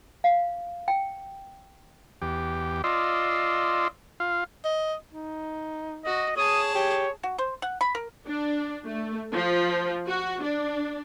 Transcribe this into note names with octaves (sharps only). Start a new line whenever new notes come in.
F5
G5
E2 G4
F4 D5 D#5 C6 E6
F4 F5
D#5
D#4
F#4 D#5
G#4 C#5 A5 D#6
G4 C#5
F#4
C5
F#5
B5
A#4
D4
A3
F3
F#4
D4